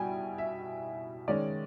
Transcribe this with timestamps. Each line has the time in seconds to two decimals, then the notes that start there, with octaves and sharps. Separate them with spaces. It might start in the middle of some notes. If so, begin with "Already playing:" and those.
Already playing: B2 G3 E4 G5 G#5
0.38 E5
1.28 D#3 G#3 C#4 D5